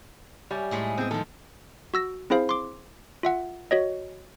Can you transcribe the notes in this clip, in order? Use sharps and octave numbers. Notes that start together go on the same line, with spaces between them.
G3 C#5 E5 G#5
A2 G#3 A3
B3 C4 G#4
D#3 F3 A4
F#4 E6 A#6
C4 E4 G#4 C5 F5
C6 D6
F4 E5 F#5
F#4 C#5 D#5